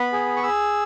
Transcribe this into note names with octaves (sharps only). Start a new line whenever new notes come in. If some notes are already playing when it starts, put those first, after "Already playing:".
Already playing: B3 B5
G#4
C#6
G#4 E6